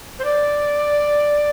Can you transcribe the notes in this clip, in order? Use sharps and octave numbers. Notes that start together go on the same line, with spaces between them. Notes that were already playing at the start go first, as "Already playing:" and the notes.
C5
D5